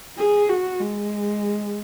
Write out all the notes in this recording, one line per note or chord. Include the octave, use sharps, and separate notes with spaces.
G#4
F#4
G#3